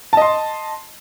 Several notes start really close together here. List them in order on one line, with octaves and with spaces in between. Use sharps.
A5 D#5 C6